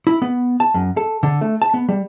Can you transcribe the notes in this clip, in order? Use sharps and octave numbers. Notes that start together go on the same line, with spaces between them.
E4
B3
A5
F#2
A4
D3
A3
A5
B3
G3